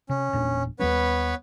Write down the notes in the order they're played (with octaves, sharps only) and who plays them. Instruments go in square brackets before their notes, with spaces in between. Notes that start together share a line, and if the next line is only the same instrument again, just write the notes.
[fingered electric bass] C3 [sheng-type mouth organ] C#4
[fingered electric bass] E1 A#2 D4
[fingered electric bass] D#2 G3 C#4 [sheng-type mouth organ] B3 B4 C#5